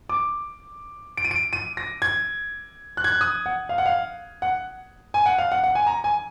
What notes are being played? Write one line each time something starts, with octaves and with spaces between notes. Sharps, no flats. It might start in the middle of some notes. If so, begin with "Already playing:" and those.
D6
D7
D#7
D7
D#7
A#6
G#6
F#6
G#6
F#6
D#6
F#5
F5
F#5
F5
F#5
G#5
F#5
F5
F#5
F#5
G#5
A#5
G#5